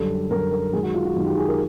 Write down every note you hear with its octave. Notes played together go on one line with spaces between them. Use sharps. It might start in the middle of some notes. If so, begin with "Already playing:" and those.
Already playing: F#2 D3 G3 A4
F#2 D3 G3 A#4
A#4
F#2 D#3 G#3 G#4
F#4
F4
F#4
F#2 D#3 G#3
G4
G#4
A#4